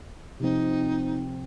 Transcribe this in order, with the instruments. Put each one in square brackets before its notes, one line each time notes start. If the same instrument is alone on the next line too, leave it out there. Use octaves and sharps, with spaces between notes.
[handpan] C3 F3 C4 [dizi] D#4